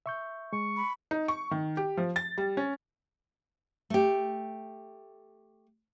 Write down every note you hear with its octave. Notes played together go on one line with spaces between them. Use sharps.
E5 C#6 G6
G#3 C#6
B5
D#4
C#6
D#3
G4
F3
A6
G3
C#4
A3 G4